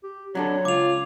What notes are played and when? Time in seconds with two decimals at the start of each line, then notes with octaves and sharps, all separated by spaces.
0.03 G4
0.35 F#3 D4 A4 C#5
0.65 C#2 F4 D6 F7